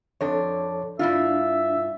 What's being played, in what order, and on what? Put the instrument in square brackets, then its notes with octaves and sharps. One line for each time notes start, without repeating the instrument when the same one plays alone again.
[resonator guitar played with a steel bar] F2 D4 [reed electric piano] A4 C#5
[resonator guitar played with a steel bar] G2 E4 F4 [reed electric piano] D4 [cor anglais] E5